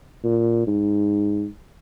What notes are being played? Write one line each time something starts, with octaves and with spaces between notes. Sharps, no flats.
A#2
G#2